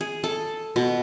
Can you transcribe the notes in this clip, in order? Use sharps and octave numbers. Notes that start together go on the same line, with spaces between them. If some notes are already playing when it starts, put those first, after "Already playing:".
G#4
A4
B2